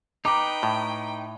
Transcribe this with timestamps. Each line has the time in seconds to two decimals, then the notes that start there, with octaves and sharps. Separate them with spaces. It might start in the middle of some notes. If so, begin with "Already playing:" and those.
0.25 D#4 B4 G5 A#5 D6
0.63 A2